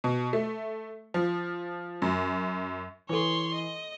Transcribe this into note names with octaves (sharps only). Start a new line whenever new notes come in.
B2
A3
F3
F#2
E3 A4 C#5 C6 C#6
D#5